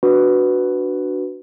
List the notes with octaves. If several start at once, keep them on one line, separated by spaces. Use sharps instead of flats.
D4 F#4 B4